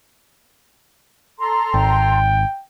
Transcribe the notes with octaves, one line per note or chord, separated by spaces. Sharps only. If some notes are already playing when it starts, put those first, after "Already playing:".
A4 A#5 C6
G#1 G5